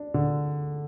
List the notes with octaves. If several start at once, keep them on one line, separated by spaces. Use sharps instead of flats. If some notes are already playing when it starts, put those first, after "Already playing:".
Already playing: D4
D3